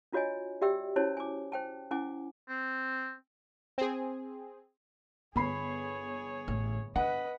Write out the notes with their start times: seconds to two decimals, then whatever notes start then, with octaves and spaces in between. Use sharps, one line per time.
0.12 D4 F4 F#4 C#5 D#5 G#5
0.62 F#4 G4 D5 E5 G5 E6
0.96 C#4 E4 F#4 C5 C#5 A5
1.17 G#5 D6
1.52 C5 G5 A5
1.91 C#4 E4 F#5 G#5 D6
2.49 C4
3.78 C4 G#4
5.36 G1 B3 G#4 C#5 B5 C7
6.48 A1
6.96 D4 B4 D#5 F#5